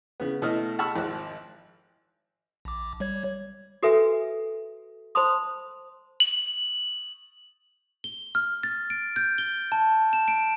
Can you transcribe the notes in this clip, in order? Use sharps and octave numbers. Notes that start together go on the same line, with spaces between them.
C#3 B3
B2 A3 E4 D#5 F6
F#5 A5 B5 C#6 E6 F6
G#1 F3 F#6
A#1 D6
G3 C#5 G#6
F#4 A4 B4 E5 G#5
C5 A5 B5 C6 D#6
F#7
G7
F6
A6
D7
G6
G7
A5
E7
D7